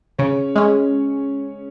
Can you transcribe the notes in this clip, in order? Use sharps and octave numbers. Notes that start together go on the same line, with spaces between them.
C#3 C#4 C#5
G#3 C#4